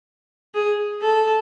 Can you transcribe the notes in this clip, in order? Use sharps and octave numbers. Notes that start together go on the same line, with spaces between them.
G#4
A4